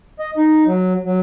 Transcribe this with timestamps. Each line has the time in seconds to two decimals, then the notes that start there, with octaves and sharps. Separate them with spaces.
0.19 D#5
0.37 D#4
0.66 F#3
1.05 F#3